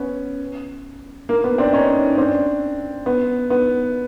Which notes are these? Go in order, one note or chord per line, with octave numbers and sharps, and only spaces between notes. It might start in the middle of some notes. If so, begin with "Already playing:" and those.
Already playing: B3 C#4
A#3
B3
C4 D4
C#4 D#4
C4 D4
B3
B3